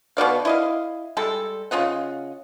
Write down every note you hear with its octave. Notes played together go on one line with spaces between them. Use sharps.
B2 F#4 D5 F5
E4 D#5 F5
G3 G#3 A4
C#3 F4 D#5 F#5